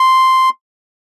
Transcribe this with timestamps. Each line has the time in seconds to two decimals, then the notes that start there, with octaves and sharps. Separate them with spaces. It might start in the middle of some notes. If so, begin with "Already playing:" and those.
Already playing: C6